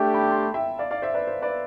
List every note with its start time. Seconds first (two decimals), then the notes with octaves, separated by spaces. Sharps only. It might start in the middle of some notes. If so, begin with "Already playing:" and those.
Already playing: A3 D4 G4 E5 G5
0.14 G5 B5
0.31 A5 C6
0.54 E5 G5
0.79 D5 F5
0.91 D5 F5
1.02 C5 E5
1.14 B4 D5
1.27 C5
1.42 B4 D5